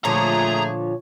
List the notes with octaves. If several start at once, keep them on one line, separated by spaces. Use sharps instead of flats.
A#2 D3 F3 A3 G#4 C#5 A#5